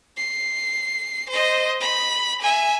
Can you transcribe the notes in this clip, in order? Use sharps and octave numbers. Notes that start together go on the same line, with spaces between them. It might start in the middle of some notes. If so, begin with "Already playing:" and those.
C7
C5 D#5
B5
E5 G#5